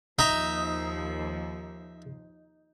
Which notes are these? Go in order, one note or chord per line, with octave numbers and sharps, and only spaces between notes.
D#2 F3 D#4 E5 A#5